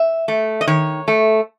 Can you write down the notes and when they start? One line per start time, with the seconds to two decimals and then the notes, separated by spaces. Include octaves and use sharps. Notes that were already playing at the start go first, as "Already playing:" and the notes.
Already playing: E5
0.28 A3
0.61 D#5
0.67 D#3 C#5
1.08 A3